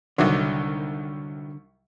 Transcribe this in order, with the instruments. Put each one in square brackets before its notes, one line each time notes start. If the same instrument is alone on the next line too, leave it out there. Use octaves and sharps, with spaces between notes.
[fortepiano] C2 D#3 F#3 [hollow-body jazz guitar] D3